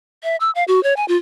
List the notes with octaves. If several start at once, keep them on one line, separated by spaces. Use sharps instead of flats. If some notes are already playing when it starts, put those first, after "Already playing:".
E5
E6
F5
F#4
C#5
G#5
F4